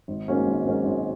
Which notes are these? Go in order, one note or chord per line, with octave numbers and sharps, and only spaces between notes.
G#1
G#2 F#3 A#3 C#4
G#1
G#2 F#3 A#3 C#4
G#1